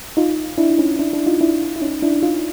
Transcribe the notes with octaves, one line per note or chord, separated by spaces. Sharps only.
D#4 F4
D4 E4
C#4 D#4
D4 E4
D4 E4
D#4 F4
D4 E4
E4
C#4 D#4
D4 E4
D#4 F4